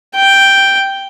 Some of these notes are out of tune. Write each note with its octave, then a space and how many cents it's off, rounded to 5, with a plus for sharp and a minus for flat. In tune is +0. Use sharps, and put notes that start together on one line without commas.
G5 +0